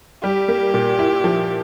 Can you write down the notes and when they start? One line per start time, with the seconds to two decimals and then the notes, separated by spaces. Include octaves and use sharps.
0.23 G3 G4
0.48 A#3
0.74 A#2
0.99 E4
1.24 F3